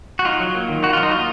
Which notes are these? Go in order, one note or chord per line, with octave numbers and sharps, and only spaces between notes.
F#4
D#4 F4
F#3
A#3
D#3
D#4 F#4
F#3 F4
D#4
A#3 F4